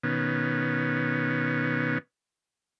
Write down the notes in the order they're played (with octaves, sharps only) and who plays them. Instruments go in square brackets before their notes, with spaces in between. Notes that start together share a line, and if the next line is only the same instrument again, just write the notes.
[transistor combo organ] B2 D#3 B3 C#4